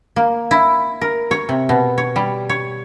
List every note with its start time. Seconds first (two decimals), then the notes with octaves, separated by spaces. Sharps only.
0.16 A#3
0.51 E4
1.01 A#4
1.31 C#5
1.49 C3
1.69 B2
1.98 C#5
2.16 G3
2.49 C#5